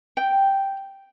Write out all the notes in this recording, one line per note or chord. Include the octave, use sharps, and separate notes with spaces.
G5